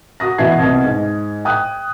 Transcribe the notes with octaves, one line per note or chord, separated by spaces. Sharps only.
F#4 D#6 A#6
B2 E3 F#4 G#6 C7
C2 B2
G#2
G5 D#6 F#6